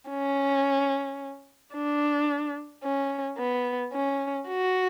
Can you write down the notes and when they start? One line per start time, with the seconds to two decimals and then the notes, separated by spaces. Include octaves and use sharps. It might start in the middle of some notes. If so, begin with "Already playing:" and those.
0.10 C#4
1.74 D4
2.84 C#4
3.38 B3
3.93 C#4
4.48 F#4